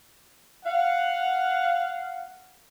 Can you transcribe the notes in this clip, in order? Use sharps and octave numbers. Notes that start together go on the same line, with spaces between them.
F5 F#5